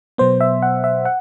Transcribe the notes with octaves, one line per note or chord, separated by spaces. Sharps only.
B2 F#3 B3 C5
E5
F#5
E5
F#5